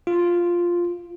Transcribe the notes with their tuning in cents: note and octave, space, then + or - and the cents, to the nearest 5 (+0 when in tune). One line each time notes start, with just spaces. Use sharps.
F4 +0